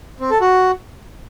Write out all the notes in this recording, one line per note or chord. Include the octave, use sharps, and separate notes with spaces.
C4
A4
F#4